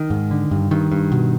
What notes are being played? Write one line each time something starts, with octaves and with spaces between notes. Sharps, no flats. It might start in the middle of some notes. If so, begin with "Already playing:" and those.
Already playing: D#3
G#2
D3
G2
G2 D#3
G2
B2